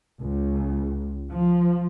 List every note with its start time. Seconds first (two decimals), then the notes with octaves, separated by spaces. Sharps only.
0.22 C#2
1.30 F3